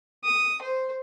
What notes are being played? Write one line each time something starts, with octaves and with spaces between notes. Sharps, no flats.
D#6
C5